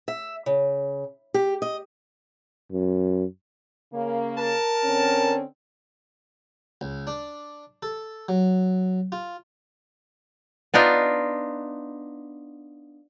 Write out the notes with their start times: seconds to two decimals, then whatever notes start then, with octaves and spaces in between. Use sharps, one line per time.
0.08 E5
0.46 C#3
1.34 G4
1.62 D#5
2.72 F#2
3.93 C#3 A#3
4.37 A#4 A5
4.84 D3 C4 C#4
6.81 C#2
7.07 D4
7.83 A4
8.29 F#3
9.12 F4
10.74 B3 D4 D#4 F4